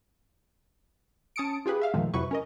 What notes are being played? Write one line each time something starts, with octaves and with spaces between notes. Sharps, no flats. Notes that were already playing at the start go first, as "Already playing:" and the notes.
C#4 A5 D#6 C#7 D7
F4 G4 G#4 B4
E5 F5
E2 A#2 D#3 F3 G#3 A3
F2 C3 F#3 E4 B4 C#6
C#4 A#4 D#5